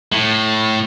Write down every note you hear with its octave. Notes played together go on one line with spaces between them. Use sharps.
A2